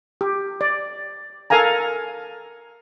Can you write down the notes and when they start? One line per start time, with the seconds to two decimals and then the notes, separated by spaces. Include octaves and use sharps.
0.21 G4
0.61 D5
1.50 A4 A#4 F5 G#5 A#5